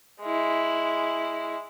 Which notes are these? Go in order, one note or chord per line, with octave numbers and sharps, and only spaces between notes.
G#3 E4